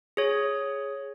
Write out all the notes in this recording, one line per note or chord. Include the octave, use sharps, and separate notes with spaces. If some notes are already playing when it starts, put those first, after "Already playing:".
G#4 C#5